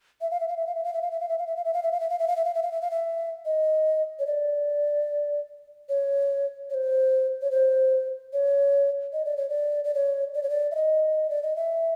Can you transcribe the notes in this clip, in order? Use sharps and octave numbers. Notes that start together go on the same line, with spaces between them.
E5
F5
E5
F5
E5
F5
E5
F5
E5
F5
E5
F5
E5
F5
E5
F5
E5
F5
E5
F5
E5
F5
E5
F5
E5
F5
E5
F5
E5
F5
E5
D#5
C#5
D5
C#5
C#5
C5
C#5
C5
C#5
D#5
D5
C#5
D5
D5
C#5
D5
C#5
D5
E5
D#5
D5
D#5
E5